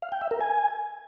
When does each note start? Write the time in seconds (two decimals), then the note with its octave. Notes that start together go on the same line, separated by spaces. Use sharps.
0.02 F5
0.12 G5
0.21 E5
0.31 A#4
0.41 G#5